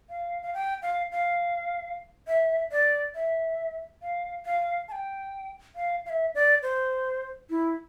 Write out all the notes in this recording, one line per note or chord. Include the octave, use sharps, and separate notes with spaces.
F5
F5
G5
F5
F5
E5
D5
E5
F5
F5
A5
G5
F5
F5
E5
D5
C5
E4